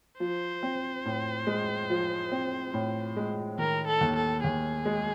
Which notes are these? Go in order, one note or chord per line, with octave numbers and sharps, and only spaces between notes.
F3 C5
C4
A2
G#3
F3
C4
A2
G#3
D#3 A#4
A4
D#2
A4
D#2 G#4
G#3